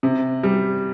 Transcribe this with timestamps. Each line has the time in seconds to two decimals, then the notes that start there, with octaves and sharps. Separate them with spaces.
0.03 C3
0.43 G3